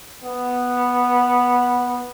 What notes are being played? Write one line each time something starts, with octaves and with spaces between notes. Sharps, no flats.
B3